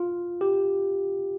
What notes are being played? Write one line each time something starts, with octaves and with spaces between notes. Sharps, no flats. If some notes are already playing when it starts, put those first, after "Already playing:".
Already playing: F4
G4